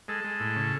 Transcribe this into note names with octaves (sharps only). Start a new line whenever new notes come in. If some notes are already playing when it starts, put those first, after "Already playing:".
G#3 A4
G#3
A2
C#3